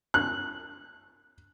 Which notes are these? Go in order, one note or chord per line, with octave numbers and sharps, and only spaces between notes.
F#6